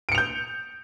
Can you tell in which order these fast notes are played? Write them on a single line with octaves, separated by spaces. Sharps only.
D7 C#7 F7 G6